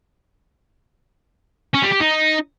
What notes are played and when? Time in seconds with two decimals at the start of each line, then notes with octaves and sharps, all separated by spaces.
1.74 C#4
1.83 G3
1.92 G4
2.01 D#4